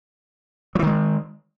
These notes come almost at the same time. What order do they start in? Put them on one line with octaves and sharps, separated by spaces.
F#3 E3 D#3 G#3